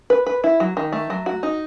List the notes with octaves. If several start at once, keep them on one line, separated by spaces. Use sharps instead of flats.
B4
B4
E4
F#3
D#3
A3
F#3
F#4
D#4